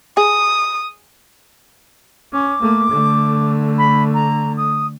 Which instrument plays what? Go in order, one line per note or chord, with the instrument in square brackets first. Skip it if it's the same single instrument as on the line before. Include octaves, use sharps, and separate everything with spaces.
[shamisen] G#4 [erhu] D#6
[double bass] C#4 [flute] D6
[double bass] A3 A#3
D3 A3
[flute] B5
A#5
D#6